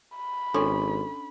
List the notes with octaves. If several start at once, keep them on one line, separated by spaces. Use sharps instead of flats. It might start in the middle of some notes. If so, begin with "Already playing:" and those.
B5
G#1 C#4 D4 A4 C6